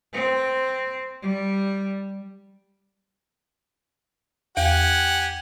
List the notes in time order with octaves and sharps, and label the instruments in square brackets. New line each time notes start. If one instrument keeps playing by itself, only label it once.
[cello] C4
G3
[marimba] E2 [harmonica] G4 F#5 G#5